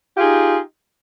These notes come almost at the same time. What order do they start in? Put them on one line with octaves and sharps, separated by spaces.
G4 F4 G#4 D#4